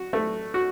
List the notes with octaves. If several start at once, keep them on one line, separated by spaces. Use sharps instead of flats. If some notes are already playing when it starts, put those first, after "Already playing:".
Already playing: F#4
A3
F#4